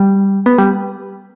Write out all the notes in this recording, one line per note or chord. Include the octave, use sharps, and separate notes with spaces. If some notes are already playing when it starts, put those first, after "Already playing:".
Already playing: G3
B3
G3